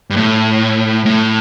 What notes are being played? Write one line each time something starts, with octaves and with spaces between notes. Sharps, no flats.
G2
A2
A2